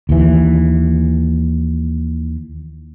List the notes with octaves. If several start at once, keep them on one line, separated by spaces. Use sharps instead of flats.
D#2 E3